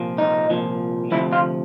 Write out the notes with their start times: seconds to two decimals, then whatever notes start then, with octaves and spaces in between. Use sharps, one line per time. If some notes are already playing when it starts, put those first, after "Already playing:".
Already playing: C2 A#2 F3
0.18 D#4
0.49 C2 A#2 F3
1.11 D2 C3 F3 E4
1.33 F4